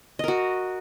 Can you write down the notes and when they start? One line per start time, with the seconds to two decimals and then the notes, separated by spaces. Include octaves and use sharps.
0.19 D#5
0.24 A#4
0.28 F#4